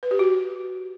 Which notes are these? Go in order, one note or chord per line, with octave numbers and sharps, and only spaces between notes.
B4
G4
F#4